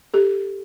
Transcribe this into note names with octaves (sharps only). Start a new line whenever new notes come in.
G4 A4